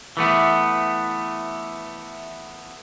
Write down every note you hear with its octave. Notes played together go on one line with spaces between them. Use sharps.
E3 A3 B3